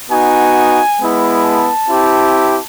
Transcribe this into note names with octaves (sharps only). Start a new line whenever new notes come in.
B3 D#4 F#4 G#5
G#3 B3 E4
A5
C4 E4 G4